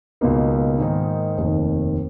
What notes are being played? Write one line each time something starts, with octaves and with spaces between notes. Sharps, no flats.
C#2 B2 A#3 D#4
G#2 D#3 A#3 D#4
F1 D#2 D#3